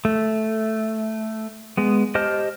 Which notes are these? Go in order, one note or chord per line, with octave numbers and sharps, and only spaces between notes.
A3
G#3 B3
G4 C5 D#5 A5 F6